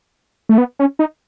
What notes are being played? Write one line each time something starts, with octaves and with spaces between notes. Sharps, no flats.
A3
B3
C#4
D#4